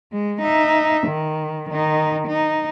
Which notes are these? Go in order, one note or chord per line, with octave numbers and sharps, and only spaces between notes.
G#3
D#4 E5
D#3
D#3 D#4
D#4